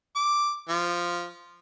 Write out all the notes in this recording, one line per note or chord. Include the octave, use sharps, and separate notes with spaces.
D6
F3